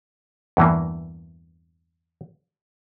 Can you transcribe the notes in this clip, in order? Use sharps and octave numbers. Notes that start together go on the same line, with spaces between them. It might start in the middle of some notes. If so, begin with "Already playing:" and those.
E2 G2 E3 A#3